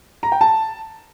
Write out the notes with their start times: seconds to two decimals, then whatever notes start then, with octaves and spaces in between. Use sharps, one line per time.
0.23 A#5
0.32 G5
0.41 A5